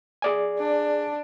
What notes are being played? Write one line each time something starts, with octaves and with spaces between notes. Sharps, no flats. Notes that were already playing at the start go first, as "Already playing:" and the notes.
G#4 D5 G#5
D4